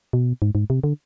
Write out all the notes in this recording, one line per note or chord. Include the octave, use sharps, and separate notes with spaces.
B2
G#2
G#2
C3
D3